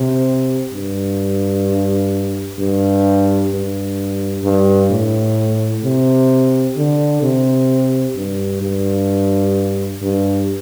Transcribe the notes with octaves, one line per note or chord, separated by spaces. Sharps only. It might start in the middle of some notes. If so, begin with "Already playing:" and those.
Already playing: C3
G2
G2
G2
G2
A2
C3
D3
C3
G2
G2
G2